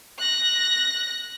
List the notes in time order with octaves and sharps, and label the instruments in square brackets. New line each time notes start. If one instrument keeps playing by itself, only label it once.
[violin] F#6 A#6